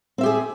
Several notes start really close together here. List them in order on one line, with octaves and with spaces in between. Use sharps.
C4 E5 G4 G#4